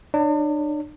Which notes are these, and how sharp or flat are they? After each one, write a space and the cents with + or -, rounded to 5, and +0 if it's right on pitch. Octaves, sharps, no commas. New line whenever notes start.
D4 +40 C#5 +30